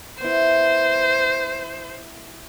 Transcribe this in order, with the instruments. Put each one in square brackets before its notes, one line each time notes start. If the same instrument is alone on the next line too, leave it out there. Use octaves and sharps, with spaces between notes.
[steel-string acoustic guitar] B3 E4 [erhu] C5